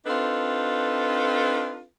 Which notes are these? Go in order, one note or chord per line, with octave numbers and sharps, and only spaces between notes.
C4 D4 D#4 F4 A4 B4